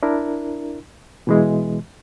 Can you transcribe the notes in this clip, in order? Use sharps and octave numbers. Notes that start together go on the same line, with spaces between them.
D4 E4 A#4
B2 E3 G#3